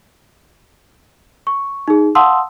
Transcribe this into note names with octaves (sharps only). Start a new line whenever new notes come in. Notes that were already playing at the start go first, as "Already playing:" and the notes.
C#6
D#4 G#4
F5 F#5 A5 C6 D#6 E6